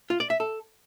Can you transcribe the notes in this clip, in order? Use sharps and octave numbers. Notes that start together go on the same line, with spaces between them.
F4
D5
E5
A4